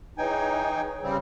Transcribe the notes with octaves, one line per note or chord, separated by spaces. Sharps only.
E3 D#4 G#4 B4 C#5 G5 G#5
C#3 G3 C4